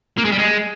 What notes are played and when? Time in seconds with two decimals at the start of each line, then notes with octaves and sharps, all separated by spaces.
0.18 A#3
0.25 G#3
0.32 G3
0.39 G#3